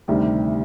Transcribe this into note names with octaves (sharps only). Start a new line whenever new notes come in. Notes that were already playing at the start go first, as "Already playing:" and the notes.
D2 C3 D#3 G3